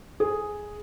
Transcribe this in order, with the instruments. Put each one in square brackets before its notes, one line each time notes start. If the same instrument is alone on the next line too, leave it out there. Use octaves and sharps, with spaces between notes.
[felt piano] G#4